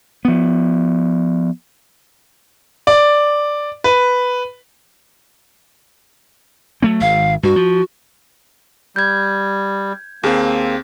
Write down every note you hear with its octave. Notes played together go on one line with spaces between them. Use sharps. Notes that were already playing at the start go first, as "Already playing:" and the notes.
F3 B3
D5
B4
F#3 A3 C4
G#1 F5
G2 F#4
F3
G3 G6 G#6
D#2 A#3 C4 G#4